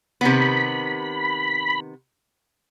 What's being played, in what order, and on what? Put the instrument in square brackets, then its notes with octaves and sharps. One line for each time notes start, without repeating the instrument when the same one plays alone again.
[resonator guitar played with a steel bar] C3 D#3 B3 [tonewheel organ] B5